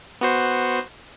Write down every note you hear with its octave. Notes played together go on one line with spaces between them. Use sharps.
B3 F#4 C5